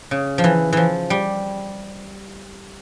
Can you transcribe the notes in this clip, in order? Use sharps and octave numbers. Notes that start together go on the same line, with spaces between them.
C#3
F3
E3
E3 F3
G3